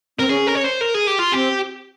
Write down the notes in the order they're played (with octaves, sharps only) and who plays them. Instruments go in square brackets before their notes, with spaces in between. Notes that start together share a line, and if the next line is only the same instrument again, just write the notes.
[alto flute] C4 [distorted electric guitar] A#4
[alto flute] C#4 [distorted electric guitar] G#4
[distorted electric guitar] A#4
C#5
C5
A#4
G#4
G4
F4
[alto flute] C4 [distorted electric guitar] G4